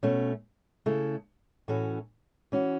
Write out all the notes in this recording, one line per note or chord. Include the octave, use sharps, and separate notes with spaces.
B2 A3 C#4
C#3 A3 E4 A4
A2 E3 C#4 F#4 A4
E3 C#4 F#4